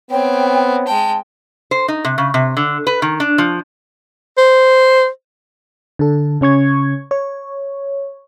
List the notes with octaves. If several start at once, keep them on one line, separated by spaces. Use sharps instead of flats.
B3 C4 C#5 G5
G#3 G5 A5
C5
D#4
C3
C#3
C3
D3
B4
D#3
D4
F3
C5
D3 A4
C#3 C#4 C#6 G#6
C#5